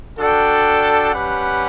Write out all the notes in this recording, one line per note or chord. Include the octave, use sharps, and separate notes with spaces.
D4 F#4 A4 D5 G5
G3 C#4 G4 B4 F#5